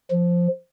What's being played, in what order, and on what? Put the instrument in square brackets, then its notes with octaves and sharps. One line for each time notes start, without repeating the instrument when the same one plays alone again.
[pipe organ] F3